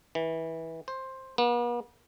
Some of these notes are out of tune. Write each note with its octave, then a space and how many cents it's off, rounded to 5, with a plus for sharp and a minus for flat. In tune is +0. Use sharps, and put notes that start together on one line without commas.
E3 -20
C5 +10
B3 -45